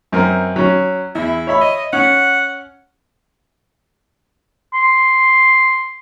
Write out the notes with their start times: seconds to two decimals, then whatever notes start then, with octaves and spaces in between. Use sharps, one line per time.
0.12 F#2 C4 A#4
0.56 F#3 C#4
1.15 E2 E4
1.47 C#5 E5 B5
1.61 D#5
1.93 C#4 F#5
4.73 C6